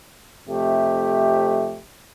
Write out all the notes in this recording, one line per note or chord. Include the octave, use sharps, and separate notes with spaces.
F2 C3 A3 G4